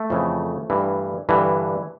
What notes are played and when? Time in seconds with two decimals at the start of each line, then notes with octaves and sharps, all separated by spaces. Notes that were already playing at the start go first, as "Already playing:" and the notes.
Already playing: A3
0.10 F2 C#3 E3
0.70 G2 E3
1.29 G2 D3 E3